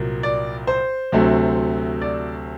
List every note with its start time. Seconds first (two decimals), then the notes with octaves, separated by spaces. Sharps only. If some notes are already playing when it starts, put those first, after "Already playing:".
Already playing: C2 A#2 F#3 A#3
0.23 D5
0.67 C5
1.12 D2 C3 F#3 A3
2.02 D5